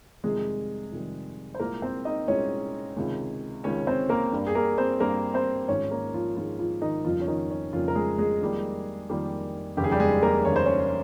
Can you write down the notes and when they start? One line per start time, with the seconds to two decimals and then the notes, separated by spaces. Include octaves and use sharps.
0.24 F2 C3 D#3 G3 G#3 G#4
0.92 F2 C3 D#3 G3
1.55 C5
1.60 C2 A#2 G#3 A#3 A#4
1.82 C4 C5
2.05 D#4 D#5
2.28 C2 A#2 G#3 C#4 C#5
2.96 C#2 C3 D#3 G#3
3.64 C#2 C3 D#3 G#3 C#4 C#5
3.87 C4 C5
4.09 A#3 A#4
4.32 G2 G3 A#3
4.47 G#4
4.55 A#3 A#4
4.78 C4 C5
5.00 G2 G3 A#3 A#4
5.34 C4 C5
5.68 G#1 G#2 F3 G#3 C#4 C#5
5.91 A#3 A#4
6.14 F3 F4
6.36 G#1 G#2 F3 G#3 F4
6.59 F3 F4
6.82 D#3 D#4
7.05 F1 F2 C#3 F3 G3 A#3 F4
7.21 C#4
7.28 D#3 D#4
7.50 C#4
7.73 F1 F2 C#3 F3 G3 A#3 F4
7.88 A#4
7.95 G#3 G#4
8.18 G#3 G#4
8.41 F2 D#3 G3 A#3
9.09 F2 D#3 G3 A#3
9.77 F1 D#2 C#3 G4
9.84 G#4
9.92 G3 G4
10.00 G#3 G#4
10.23 A#3 A#4
10.45 F1 D#2 C#3 C#5
10.56 C5
10.66 C#4 C#5